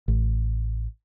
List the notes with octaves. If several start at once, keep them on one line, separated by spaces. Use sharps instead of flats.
A1